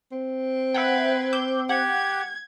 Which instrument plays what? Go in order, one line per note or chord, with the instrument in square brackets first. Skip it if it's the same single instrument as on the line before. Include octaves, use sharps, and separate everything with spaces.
[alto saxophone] C4
[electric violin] B4 G#6 [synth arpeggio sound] E5 F#5 G5
[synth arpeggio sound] D6 E6 G6
[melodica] G4 [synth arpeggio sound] F#5 [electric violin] G#6